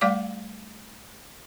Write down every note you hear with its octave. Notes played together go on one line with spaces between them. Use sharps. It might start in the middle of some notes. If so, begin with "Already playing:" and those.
G3 A3 D5 F5 D6